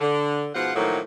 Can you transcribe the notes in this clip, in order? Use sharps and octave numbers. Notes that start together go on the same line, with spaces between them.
D3
G#2 B2 F3 F4 F#5
A2 D#3 F3 F#3 A3 A#3